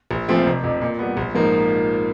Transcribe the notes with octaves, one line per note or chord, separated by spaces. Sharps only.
A#1
A#2 F3 A3 C4
F1
F2 C3
A#2
G3 B3
A#1
G#2 F3 A#3 D#4